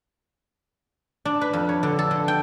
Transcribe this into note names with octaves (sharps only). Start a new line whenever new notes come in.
D4
B4
F2
C#5
D3
A4
D3
G5